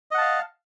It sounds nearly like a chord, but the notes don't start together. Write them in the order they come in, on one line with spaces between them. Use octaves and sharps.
D#5 F#5 A5 F5